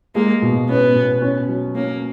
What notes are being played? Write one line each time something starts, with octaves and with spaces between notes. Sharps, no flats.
G#3 A#3
B2
B3 C#4
B2
C#4
F#3
A#3 C#4